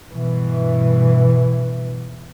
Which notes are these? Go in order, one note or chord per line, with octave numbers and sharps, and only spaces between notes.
G2 B2 E3